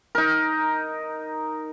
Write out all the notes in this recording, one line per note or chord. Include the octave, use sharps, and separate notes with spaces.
D#4 A#4